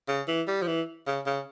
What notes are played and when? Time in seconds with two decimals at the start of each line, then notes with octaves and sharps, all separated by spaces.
0.08 C#3
0.28 E3
0.48 G3
0.62 F3
0.67 E3
1.06 C#3
1.26 C#3